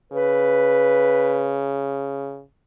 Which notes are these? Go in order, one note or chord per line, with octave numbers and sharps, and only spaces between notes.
C#3 B4